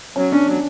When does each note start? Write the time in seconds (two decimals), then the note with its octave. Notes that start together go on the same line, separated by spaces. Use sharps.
0.16 F#3 C#4
0.31 C#4 D4
0.47 F#3